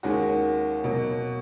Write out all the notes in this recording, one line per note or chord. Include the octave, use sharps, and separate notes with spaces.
D#2 D#3 G#3 C#4 F#4
B2 F#3 A#3